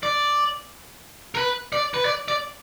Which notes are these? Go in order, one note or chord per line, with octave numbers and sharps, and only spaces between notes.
D5
A#4
B4
D5
B4
D5
D5